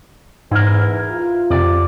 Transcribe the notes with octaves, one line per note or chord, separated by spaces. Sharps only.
E2 G#2 E4 A#4
F4
F2 C3 D5